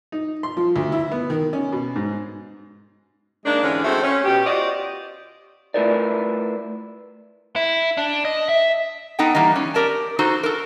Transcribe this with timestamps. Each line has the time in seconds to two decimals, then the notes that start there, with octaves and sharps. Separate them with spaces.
0.12 D#4
0.43 C6
0.57 F3
0.76 D2
0.92 E4
1.12 B3
1.30 D#3
1.53 C#4
1.72 B2
1.96 G#2
3.46 D#3 G#3 A#3 D4
3.63 G#2 D3 E3 C#4
3.84 G#3 A3 C4 E4 F#4
4.04 C#4
4.25 B2 G4
4.46 F4 F#4 C5 D5 D#5
5.74 A3 E4 F4 A#4 B4 D5
7.56 E4
7.97 D4
8.25 D#5
8.49 E5
9.19 B3 D#4 A4 F#5 G5
9.35 E3 G3 A#3 D#4
9.56 C#4
9.74 G4 A#4 D5 A5
10.19 D#4 F#4 A4 C5
10.43 A4 A#4